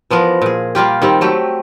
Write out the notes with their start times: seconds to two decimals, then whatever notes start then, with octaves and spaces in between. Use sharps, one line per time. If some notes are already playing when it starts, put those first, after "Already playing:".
0.11 E3 F3 B3 A#4
0.42 A#2 G#4
0.75 G3 A#3 F4 G4
1.02 D#3 G3 C4
1.21 F#3 A3 G4